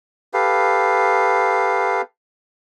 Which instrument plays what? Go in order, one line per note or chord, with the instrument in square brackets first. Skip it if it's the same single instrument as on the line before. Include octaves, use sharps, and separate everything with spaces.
[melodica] G4 A4 B4 F5